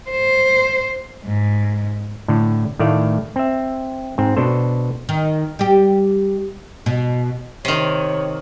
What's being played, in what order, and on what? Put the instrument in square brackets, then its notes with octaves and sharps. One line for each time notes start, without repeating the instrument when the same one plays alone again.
[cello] C5
G#2
[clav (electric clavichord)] A2 D3
A2 D#3 A3 D5 F5
C4 E5
G#2 C4
B2 D4 A4 C5
[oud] D#3
G3 G4
B2
[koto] C3 D#3 [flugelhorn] C#5